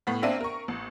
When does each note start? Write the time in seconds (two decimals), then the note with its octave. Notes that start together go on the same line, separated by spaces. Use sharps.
0.07 A2 B3
0.22 A#3 C4 D4 E5 D#7
0.41 A#4 C#6
0.68 A1